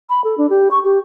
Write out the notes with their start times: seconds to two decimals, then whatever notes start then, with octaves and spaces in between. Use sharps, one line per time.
0.09 B5
0.24 A4
0.38 D4
0.50 G4
0.71 C#6
0.84 G4